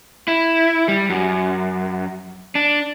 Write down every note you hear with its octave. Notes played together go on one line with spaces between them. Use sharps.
E4
G3
F#2
D4